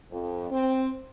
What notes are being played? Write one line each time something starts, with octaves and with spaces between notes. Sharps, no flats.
F2
C4